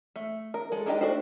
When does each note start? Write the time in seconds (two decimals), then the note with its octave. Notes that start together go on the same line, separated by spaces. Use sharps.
0.16 A3
0.54 A#4
0.72 G#3 A4
0.86 G#3 D4 D#4 G4 G5
1.01 A3 D4 F#4 C5